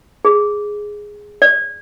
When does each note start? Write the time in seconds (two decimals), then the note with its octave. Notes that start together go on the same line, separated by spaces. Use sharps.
0.25 G#4
1.42 D5